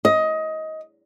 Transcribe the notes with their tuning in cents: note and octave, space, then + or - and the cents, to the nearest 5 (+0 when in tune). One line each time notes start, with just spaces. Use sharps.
D#5 +20